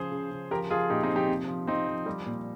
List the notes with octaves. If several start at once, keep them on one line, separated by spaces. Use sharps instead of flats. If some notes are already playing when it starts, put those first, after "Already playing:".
Already playing: C#3 F3 G#4 C5
C#3
C#3
F3 G4 A#4
F3 F4 G#4
A#2 D#4 G4
C4 D#4
F3
D#4 G4
C3
F3
F3 C4 D#4
F3
G3
A#2